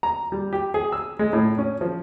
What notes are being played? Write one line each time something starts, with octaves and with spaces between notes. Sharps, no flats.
A#5
G3
G4
G#4
E6
G#3
A2
C#4
F3